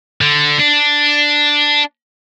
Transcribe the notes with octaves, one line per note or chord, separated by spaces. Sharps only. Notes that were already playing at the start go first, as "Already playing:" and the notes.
D3
D4